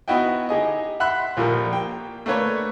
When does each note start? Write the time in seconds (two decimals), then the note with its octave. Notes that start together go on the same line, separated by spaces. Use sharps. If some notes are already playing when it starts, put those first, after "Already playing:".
0.08 B3 D#4 E4 F#4 D#5 G5
0.49 D#4 G4 G#4 D#5
1.00 E5 F#5 B5 C6 F#6
1.37 A#1 F3 G3 A#4
1.71 A#3 G5
2.26 A3 A#3 D4 B4 C#5